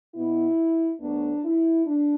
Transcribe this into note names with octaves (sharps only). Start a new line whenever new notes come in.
B2 B3 E4
D2 D3 F#3 B3 D4
E4
D4